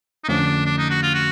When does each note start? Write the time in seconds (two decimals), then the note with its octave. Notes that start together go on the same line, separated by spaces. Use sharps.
0.24 D#4
0.28 F2 D3 F3 A3 C#4 D4
0.66 D4
0.78 D#4
0.90 F#4
1.03 F4
1.15 F#4